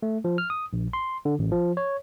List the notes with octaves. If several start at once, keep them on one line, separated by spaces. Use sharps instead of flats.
A3
F3
F6
D#6
A#1
C6
D3
A1
F3
C#5